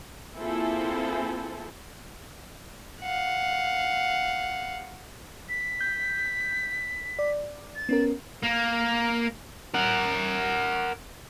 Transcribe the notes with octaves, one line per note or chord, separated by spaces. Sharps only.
A#3 C4 E4 F4 G#4 A4
F5 F#5
B6
G6
D5
A6
B3 C#4 A#4
A#3
A#4 F#5